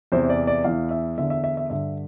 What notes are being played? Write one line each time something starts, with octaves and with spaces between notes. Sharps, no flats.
E2 C3 E3 C5
D5
D5
E2 E3 F5
E5
E2 D3 E5
E5
E5
E5
G2 D3 E5